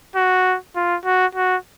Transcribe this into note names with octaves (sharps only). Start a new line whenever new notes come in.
F#4
F4
F#4
F#4